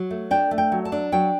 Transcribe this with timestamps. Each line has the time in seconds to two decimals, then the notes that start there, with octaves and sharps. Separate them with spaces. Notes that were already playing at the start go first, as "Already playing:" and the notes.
Already playing: F#3
0.11 A3
0.31 D4 G5
0.51 A3
0.58 G5
0.72 F#3
0.85 A5
0.92 D4
1.12 F#3 G5